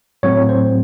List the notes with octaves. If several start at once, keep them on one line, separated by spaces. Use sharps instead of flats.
A2 F#3 A3 C4 C#5
C5